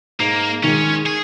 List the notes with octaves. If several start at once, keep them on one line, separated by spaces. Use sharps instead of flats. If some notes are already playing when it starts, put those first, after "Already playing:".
G#2 A#3
D#3 G#3 C#4
G#4